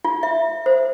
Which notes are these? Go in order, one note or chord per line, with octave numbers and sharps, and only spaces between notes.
F4
E5
C5